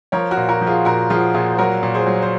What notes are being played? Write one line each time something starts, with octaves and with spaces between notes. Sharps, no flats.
F3 A#4 C#5
F#4 A#4
A#2
F#4 A#4
F3
F4 G#4
A#2 F#4 A#4
F3 F4 G#4
A#2 F4 G#4
C5
F#3 F#4 A#4
A#2
G#4 C5
F#3
C5